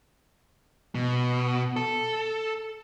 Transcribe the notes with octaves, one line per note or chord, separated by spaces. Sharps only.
B2
A4